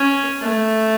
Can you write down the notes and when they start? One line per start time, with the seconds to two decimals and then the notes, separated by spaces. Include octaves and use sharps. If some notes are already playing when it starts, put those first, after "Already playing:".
Already playing: C#4
0.41 A3